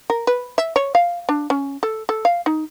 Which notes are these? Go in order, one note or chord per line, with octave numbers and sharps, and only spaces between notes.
A#4
B4
E5
C#5
F5
D4
C#4
A4
A4
F5
D#4